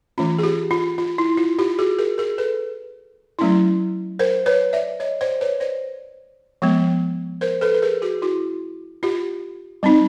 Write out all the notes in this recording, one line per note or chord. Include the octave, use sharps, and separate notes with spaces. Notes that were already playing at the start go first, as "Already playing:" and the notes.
E3 A3 C#4 F4
G#4
F4 G4
F4
F4
E4
F4
F4 G4
F#4 G#4
G#4 A#4
G#4 A#4
A4 B4
F#3 A3 C#4 E4
A#4 C5
B4 C#5
D5 E5
C#5 D#5
C5 D5
B4 C#5
C5 D5
F3 G#3 B3
A#4 C5
A4 B4
B4
G#4 A#4
F#4 G#4
E4 F#4
F4 G4
G3 C4 D#4